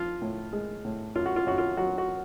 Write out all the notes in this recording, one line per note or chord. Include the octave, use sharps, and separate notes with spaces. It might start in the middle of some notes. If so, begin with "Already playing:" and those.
Already playing: F3 F4
A2
G#3
A2
F#2 F4
F#4
F4
F#2 F#4
F4
F#3 F#4
F#4